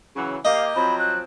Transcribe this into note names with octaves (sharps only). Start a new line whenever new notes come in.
C#3 E3 F#3
A#3 G4 D#5 F5
F3 F#3 C4 B5
F#6